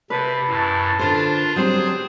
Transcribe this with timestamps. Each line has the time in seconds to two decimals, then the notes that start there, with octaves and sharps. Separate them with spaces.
0.10 C3 B4 A5
0.48 F#2 A2
0.99 D3 D4 F4 A#4 C5
1.56 F#3 G3 C4 G#4 C5